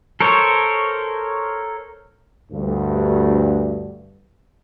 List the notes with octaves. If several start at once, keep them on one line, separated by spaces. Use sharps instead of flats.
A4 A#4 C5 C#5
D2 G2